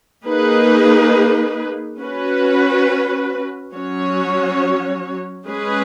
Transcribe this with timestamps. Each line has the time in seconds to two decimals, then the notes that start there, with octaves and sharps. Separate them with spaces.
0.24 A#3 D#4 G#4 B4
1.99 C#4 F#4 B4
3.73 F#3 C#4 F#4 C#5
5.47 G#3 C#4 G#4 B4